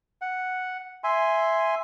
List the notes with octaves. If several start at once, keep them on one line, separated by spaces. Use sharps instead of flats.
F#5
E5 G#5 C6